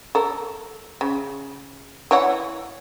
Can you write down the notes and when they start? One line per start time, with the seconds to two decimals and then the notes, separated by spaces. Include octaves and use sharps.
0.15 A4 A#4
1.01 C#3
2.11 E3 C#5 F#5